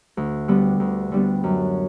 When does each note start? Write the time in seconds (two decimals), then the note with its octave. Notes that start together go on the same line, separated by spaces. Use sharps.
0.17 D2
0.48 D3 G3 B3
0.80 D2
1.12 D3 G3 B3
1.44 F#2